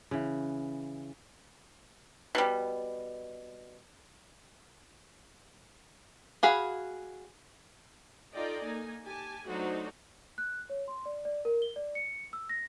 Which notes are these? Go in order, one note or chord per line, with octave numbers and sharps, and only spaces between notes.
C#3 E3
B2 G3
F#4 G#4 F5 B5
D#4 F4 A4 D5 D#5 G5
A#3 D#4 G#5
G4 G#5 A5
F#3 A3 D4 D#4 F#4 C5
F#6
C#5
C6
D5
D5
A#4
G7
D5
C#7
E6
A#6